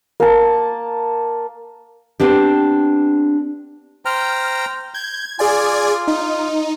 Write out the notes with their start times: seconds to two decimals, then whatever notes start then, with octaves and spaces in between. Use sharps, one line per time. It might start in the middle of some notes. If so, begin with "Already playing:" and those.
0.20 A#3 A5
2.20 B3 C4 D4 G4
4.05 C5 G5 A#5 F6
4.94 G6 G#6
5.39 F4 G#4 D5 G#5
6.08 D#4